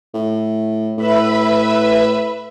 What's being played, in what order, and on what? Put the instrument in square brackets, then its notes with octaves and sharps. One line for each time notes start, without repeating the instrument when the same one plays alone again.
[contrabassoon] A2
[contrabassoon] A2 [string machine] B4 E5 B5